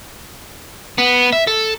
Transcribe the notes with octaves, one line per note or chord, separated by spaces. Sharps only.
B3
E5
A4